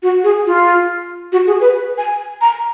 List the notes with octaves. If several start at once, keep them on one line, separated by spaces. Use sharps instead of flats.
F#4
G#4
F4
F#4
G#4
B4
G#5
A#5